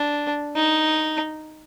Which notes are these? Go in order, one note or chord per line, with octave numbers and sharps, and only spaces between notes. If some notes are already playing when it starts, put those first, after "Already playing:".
Already playing: D4
D#4